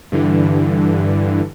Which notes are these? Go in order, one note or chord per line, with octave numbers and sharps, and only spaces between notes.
G2 D3 E3